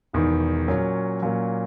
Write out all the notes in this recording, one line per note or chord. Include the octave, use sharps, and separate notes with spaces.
E1 E2 D#3
A#2 F#3 A#3 C#4
A#2 F#3 A#3 C#4